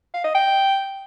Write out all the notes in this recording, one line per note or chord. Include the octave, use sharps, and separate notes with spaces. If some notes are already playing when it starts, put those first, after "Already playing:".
F5
D#5
G5